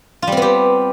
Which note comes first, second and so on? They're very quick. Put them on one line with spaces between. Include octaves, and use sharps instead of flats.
F4 G3 C4 B3 G4